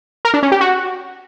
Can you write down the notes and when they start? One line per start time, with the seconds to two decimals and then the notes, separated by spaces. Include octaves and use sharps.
0.25 A#4
0.34 D4
0.43 C#4
0.52 G4
0.61 F#4